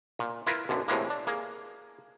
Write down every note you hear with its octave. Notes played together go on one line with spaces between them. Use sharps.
A#2
E4 F4 A#4 B4
B1 F#2 D3
A2 C3 E3 G#3 A#3
D4
A#3 G#4